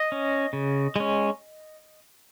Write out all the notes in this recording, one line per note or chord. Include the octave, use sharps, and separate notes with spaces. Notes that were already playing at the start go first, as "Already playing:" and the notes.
Already playing: D#5
C#4
C#3
G#3 C#4